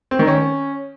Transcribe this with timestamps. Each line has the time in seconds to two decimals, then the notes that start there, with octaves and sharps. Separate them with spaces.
0.11 C4
0.19 D#3
0.27 C#4